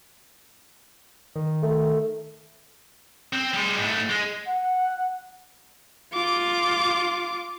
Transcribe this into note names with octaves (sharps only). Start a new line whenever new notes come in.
D#3
A3
C4
G3 G#3
G#2 A3
G#3
F#5
F4 D6